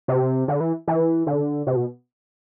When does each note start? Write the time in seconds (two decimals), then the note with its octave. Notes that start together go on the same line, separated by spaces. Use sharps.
0.08 C3
0.48 D3
0.60 E3
0.88 E3
1.27 D3
1.67 C3
1.76 B2